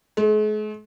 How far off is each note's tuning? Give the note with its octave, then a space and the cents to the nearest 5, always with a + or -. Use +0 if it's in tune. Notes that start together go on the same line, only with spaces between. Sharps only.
G#3 +45